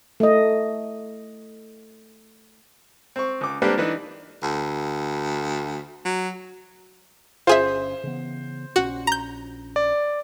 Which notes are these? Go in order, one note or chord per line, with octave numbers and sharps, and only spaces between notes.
A3 D#5
C4 C#6
C#2 D6
G3 A#3 C4 D4 G4 B4
E3 D4 D#4 B4
D2
F#3
G1 C#4 F4 G#4 C5 E5
C#3 E3 B3
A#1 C#4 F#4
A#5 G6
D5